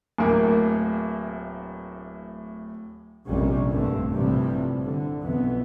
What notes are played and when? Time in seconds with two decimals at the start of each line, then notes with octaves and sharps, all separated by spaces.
0.18 D1 A2 A#3
3.28 A#1 F2 C3 G3 A#3 C#4
3.73 A1 G2 D3 A3 C4
4.13 A#1 A2 C3 E3 F3 G3
4.85 D3
5.22 B1 F2 E3 B3